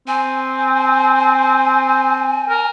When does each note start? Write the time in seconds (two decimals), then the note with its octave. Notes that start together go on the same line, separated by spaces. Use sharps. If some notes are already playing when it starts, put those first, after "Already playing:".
0.08 C4 G#5
2.49 A#4